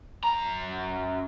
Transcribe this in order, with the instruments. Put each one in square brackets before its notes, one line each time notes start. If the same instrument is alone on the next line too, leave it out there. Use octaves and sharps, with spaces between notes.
[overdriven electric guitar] F#2 A#5